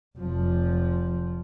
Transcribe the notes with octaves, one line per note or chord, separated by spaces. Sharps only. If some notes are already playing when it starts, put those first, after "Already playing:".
F1 F3